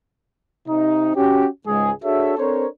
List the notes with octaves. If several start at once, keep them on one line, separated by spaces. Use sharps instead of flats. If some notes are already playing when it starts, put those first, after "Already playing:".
C3 D#4
C#4 F#4 G4
C#2 G#2 G#3 G#4
D4 F#4 G#4 A4 C#5 E5
C4 D4 A4 A#4 C5 C#5